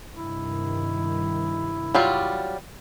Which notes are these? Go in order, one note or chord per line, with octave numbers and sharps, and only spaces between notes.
G2 C3 D#3 E4
F#3 G3 F4